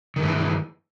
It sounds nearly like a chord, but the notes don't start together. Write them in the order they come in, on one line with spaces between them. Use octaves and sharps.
D#3 G2 E3